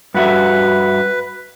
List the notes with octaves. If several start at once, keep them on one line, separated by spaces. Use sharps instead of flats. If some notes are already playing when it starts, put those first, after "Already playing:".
G2 F#4 B4 E5